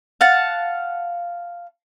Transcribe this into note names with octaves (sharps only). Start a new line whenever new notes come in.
F5 F#5 A5